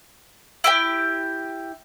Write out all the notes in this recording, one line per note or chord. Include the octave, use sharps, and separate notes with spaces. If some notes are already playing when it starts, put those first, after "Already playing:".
E4 G4 G5